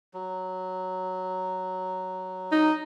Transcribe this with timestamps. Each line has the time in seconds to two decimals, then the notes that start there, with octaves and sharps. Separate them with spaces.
0.14 F#3
2.52 D#4